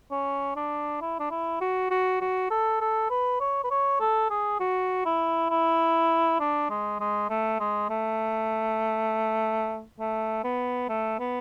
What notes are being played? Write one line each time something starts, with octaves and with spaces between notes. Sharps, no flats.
C#4
D4
E4
D4
E4
F#4
F#4
F#4
A4
A4
B4
C#5
B4
C#5
A4
G#4
F#4
E4
E4
D4
G#3
G#3
A3
G#3
A3
A3
B3
A3
B3